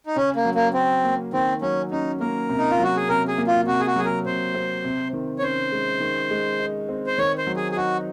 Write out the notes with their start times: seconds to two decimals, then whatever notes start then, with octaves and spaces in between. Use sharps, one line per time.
0.06 D#4
0.16 C#3 C#4
0.36 A#3
0.45 F#3
0.55 A#3
0.74 C4 C#4
1.04 A#3
1.33 D#3 C4
1.62 F#3 C#4
1.91 C#4 D#4
2.20 A#3 A#4
2.50 C3
2.58 D#4
2.71 F4
2.79 F#3 F#4
2.96 G#4
3.09 C3 A#4
3.28 G#4
3.38 A#3
3.47 F4
3.67 C3 F#4
3.80 G#4
3.87 F#4
3.96 F#3 G#4
4.05 A#4
4.25 C3 C5
4.55 C4
4.85 C3
5.13 D#3
5.39 C#5
5.42 C#4 C5
5.72 G#3
6.00 D#3
6.31 G#3
6.59 D#4
6.89 C4
7.07 C5
7.18 D#3 C#5
7.38 C5
7.47 F#3
7.57 G#4
7.72 G#4
7.77 D#4 F#4